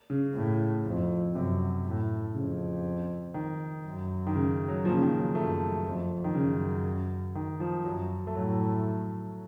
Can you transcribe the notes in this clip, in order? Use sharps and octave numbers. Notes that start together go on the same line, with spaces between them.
C#3
A2
F2
F#2 C3
A2
F2 C#3
D#3
F#2
D#3
C#3
F#3
A#2 F3
C#3
D#3
F#3
F#2 A3
F2
D#3
F#2 C#3
D#3
F3
F#2 F#3
A3
A2 F#3